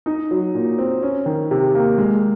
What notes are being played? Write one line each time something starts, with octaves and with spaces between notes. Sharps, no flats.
D#4
F#3
A#2
C4
C#4
D#3
C3
A#3
G#3